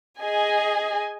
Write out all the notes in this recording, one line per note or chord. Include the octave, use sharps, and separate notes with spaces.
G#4 D#5 G#5